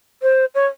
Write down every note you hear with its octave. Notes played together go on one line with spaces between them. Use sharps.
C5
C#5